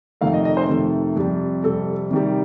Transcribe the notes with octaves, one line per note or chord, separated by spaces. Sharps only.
F2 C3 D#3 A3 F5
D#5
D#5
C5
F2 C3 D#3 A3
F2 C3 G3
F2 C3 G3 A4
C3 D#3 G3